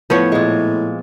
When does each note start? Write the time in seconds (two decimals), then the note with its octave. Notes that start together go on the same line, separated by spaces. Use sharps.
0.10 A2 F3 B3 C#5
0.32 A#2 G#3